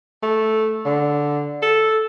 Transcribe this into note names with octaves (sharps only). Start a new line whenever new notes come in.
A3
D3
A4